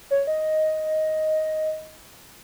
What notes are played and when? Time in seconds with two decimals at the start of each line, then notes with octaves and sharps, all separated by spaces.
0.11 C#5
0.27 D#5